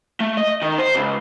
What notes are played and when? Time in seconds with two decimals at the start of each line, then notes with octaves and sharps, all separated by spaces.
0.20 A3
0.37 D#5
0.62 D#3
0.78 C5
0.95 C#2